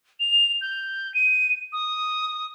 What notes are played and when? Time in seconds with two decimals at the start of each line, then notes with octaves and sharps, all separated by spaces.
0.20 F7
0.61 G6
1.14 D#7
1.73 D#6